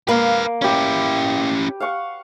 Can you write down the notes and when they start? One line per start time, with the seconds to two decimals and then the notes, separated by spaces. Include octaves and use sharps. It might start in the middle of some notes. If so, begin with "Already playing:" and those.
0.08 A#3 B4 F5
0.62 C#4 E4 G4 B4
1.80 F5 F#5 C#6